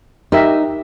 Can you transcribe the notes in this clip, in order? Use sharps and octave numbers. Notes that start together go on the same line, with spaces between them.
D#4 G4 A#4 E5